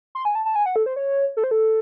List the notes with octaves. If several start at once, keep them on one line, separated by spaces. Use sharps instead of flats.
C6
G#5
A5
A5
G#5
F#5
A4
C5
C#5
A4
C5
A4